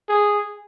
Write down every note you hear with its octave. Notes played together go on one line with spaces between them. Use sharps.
G#4